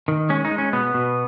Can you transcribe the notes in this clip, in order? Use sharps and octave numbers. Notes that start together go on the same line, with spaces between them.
D#3
G#3 C#4
D#4
G#3
C#4
B2 B3
B2